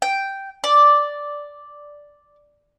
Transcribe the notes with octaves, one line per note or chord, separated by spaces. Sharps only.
G5
D5